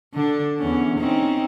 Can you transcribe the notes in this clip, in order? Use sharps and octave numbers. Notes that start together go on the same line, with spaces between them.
D3 D4
E2 C#4
C4 C#4 D#4